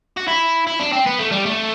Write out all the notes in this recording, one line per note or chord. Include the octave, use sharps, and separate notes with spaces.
F#4
E4
E4
D4
C4
B3
A3
G3
A3